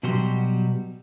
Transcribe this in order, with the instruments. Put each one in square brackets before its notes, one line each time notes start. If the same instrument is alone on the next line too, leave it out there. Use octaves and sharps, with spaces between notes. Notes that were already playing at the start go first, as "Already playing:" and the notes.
[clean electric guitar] B2 F#3 G3 F#4 G4 C6